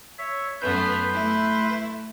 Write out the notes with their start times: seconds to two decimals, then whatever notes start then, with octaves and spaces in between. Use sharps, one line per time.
0.18 C#5 E5
0.61 F#2 A3 B3 B4 C6 G6
1.13 A3 E4